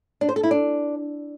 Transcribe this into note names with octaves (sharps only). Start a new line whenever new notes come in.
D4
C5
A4
E4
D4